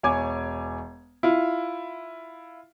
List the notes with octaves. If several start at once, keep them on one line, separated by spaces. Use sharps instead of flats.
E1 C#5 G#5 D6 G#6
E4 F4